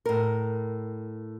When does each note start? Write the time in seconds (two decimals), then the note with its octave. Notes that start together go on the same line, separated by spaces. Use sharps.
0.05 A2 A#4